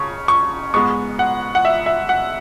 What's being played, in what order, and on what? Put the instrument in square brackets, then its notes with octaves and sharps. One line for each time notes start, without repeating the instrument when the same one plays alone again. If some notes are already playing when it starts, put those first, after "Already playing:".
Already playing: [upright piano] C#3 C#6
C#6
G#2 G#3 B3 C#6
F#5
F#5
E5
E5
F#5